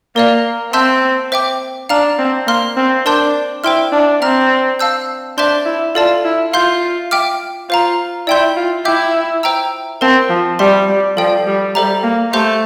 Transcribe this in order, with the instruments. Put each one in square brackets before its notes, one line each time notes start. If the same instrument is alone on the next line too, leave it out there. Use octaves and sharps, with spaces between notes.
[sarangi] A#3 [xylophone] A#4 D5 F5
[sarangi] C4 [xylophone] E5 A5 C6 E6 G6
[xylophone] C5 E5 G5 D6
[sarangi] D4 [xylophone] F5 A#5 F6
[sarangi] C4
[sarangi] A#3 [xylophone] F5 C6 F6
[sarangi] C4
[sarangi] D4 [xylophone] A#4 D5 A5 C6 G6
[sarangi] E4 [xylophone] C5 G5 C6 F6
[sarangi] D4
[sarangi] C4 [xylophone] E5 A#5 F6
[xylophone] F5 A5 E6 G6
[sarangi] D4 [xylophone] C5 E5 A5 C6 G6
[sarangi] E4
[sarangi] F4 [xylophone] A4 D5 A5
[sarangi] E4
[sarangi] F4 [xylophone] F5 C6 G6
[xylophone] E5 G5 D6 F6
[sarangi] F4 [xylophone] C5 F5 A#5
[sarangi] E4 [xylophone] D5 G5 C6 G6
[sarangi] F4
[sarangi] E4 [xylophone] E5 G5 D6 G6
[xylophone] C5 E5 G5 A#5 E6
[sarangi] C4 [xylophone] A#4 F5 A5
[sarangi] F3
[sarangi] G3 [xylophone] E5 A5 C6
[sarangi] G3
[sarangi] F3 [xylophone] A4 D5 G5
[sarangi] G3
[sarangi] G3 [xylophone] A4 C5 E5 A#5
[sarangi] A#3
[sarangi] A3 [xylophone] G4 C5 F5 C6 G6